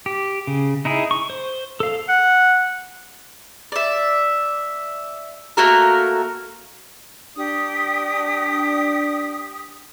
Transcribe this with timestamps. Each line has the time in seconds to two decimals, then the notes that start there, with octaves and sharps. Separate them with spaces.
0.06 G4
0.47 C#3
0.85 D#4 E4 G#4
1.11 C#6
1.30 C5
1.80 A4 F5
2.09 F#5
3.72 D5 E5
5.57 A3 A#3 F#4 A#4
7.37 D4 G4 D#6